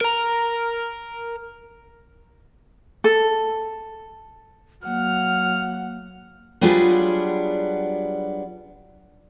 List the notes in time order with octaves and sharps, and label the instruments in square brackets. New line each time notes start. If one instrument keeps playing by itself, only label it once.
[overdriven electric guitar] A#4 A#5
[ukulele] A4
[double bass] F#3 [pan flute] A#3 [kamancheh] F#5 [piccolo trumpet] F6
[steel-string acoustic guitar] F#3 G3 B3 D4 F4 G#4